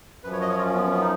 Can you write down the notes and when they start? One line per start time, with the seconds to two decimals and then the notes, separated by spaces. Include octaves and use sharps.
0.24 F#2 F3 B4
0.32 C#5
0.41 D#5
0.49 C#5
0.58 F4
0.66 C#4
0.74 B3
0.83 C#4
0.91 B3
1.01 D#4